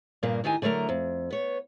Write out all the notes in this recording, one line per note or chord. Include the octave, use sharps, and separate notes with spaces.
G2 A#2 C#3 A#3 A#4
A2 D#3 G4 D#5 G#5
D3 F#3 A3 A#4 A#5
F2
B3 C#5